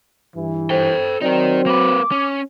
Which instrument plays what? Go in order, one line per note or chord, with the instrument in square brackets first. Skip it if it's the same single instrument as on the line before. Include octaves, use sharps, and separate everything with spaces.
[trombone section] G2 E3
[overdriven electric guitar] A4 G5 [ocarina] C5
[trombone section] F#3 C4 [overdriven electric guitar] D#4 A#4 [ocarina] D5
[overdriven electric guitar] A#3 B4 [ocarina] D6
[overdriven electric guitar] C#4